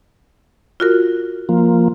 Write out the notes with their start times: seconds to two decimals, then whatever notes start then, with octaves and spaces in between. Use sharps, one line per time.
0.80 F4 F#4 A#4
1.49 F3 A#3